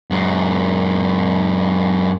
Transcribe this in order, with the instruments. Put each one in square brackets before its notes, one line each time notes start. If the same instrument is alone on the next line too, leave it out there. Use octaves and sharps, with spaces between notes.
[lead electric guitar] F#2 G#3